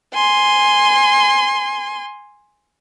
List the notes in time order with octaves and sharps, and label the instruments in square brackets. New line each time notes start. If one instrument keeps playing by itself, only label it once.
[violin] G#5 C6